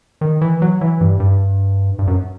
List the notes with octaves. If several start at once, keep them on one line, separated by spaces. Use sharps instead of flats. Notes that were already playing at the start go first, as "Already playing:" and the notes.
D#3
E3
F#3
E3
G2
G2
G2
F#2